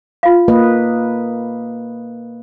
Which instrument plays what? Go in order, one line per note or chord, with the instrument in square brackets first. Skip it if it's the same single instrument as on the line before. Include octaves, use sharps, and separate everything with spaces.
[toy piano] F4 F5
[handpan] A#3 B4 D#5